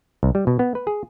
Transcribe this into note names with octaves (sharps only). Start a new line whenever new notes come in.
C2
G3
B2
B3
B4
G#4